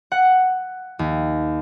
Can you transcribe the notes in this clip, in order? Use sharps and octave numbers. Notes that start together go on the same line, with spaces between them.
F#5
D#2